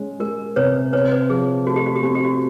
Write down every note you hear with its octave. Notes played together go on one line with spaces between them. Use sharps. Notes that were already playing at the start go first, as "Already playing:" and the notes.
Already playing: G#3 C#4
G#3 A#4
C3 B4 C#5
C4 B4 C#5
B4
F3 G#4
A3 F#4
G4
F#4
G4
C4 F#4
G4
F#4